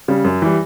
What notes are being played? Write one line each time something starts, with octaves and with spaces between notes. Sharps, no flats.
C#3 G3
F#2
E3 G3